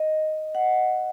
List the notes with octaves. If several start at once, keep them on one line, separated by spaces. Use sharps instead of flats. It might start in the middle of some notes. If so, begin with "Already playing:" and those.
Already playing: D#5
F#5